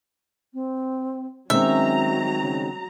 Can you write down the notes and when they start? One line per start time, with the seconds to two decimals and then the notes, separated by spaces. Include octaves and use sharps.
0.53 C4
1.50 D#3 F#3 G#3 C4 C#4 E5 A#5
2.40 C#3